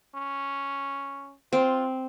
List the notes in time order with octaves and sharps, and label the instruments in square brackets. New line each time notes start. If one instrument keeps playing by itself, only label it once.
[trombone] C#4
[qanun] C4 [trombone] F4